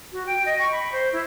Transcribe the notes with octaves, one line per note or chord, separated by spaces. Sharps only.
F#4
G5
D#5
C#6
B5
C5
E4